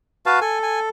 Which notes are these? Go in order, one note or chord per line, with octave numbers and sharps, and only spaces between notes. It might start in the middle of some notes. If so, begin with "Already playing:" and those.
F#4 B4 F5 A5
A4 G#5
G#5